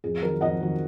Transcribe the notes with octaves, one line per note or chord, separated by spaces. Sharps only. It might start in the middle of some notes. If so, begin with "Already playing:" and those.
F2 G#4
D#3 F#3 A#4
F2 D#5 F#5
D#3 F#3